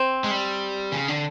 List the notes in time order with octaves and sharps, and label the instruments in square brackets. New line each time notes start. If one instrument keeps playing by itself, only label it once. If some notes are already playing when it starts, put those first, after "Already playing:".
Already playing: [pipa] C4
[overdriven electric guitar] G#3
G3
C#3
D3